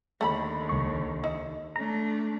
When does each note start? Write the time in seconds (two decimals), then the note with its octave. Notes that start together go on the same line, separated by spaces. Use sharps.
0.21 D#2 D3 A3 A4 B5
0.69 C#2 C#6
1.24 D#4 E4
1.76 A3 D4 A#5